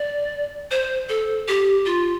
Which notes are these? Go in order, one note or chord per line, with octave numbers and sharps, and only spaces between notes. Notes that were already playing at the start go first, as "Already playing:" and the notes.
Already playing: D5
C5
A4
G4
F4